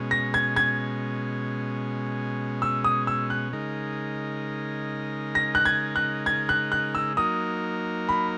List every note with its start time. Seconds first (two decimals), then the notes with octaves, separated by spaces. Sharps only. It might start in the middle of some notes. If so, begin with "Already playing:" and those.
Already playing: B2 G#3 C#4
0.11 A#6
0.34 G#6
0.56 G#6
2.62 E6
2.84 D#6
3.07 E6
3.30 F#6
3.53 C#3 G#3 D#4 A#4
5.35 A#6
5.55 F#6
5.65 G#6
5.96 F#6
6.26 G#6
6.49 F#6
6.72 F#6
6.95 E6
7.17 F#3 A#3 D#4 A#4 D#6
8.09 B5